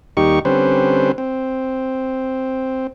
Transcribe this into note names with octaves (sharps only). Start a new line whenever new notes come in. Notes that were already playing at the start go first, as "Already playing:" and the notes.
D#2 G3 D#4 G4 C#6
D3 G3 C4 C#4 B4 C5
C4